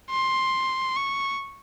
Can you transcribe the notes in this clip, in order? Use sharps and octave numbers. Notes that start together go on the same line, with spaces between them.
C6
C#6